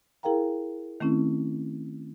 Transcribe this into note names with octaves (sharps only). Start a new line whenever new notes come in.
E4 G#4 A#4 F5 G5 A#5
D#3 A3 C4 C#4 E4